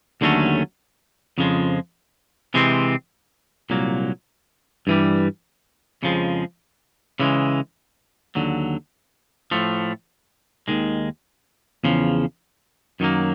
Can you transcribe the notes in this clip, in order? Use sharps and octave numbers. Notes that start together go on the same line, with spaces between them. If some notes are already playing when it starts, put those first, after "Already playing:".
D#2 D3 F#3 A3 C#4
F2 C#3 F3 G#3
C3 E3 G#3 C4
C2 A#2 F#3 A#3
G2 E3 G3
F2 C#3 F3 G#3
C#3 E3 G#3
D#2 D3 F#3
A2 F3 A3
D#2 D#3 G#3
E2 C#3 F3
F#2 D#3 F#3 A#3